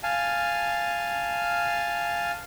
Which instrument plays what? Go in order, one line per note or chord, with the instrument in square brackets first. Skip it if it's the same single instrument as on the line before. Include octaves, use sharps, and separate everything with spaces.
[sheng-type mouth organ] F5 G#5 A5